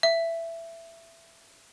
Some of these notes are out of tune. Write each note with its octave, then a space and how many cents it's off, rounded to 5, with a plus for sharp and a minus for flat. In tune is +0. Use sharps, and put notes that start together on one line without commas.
E5 +15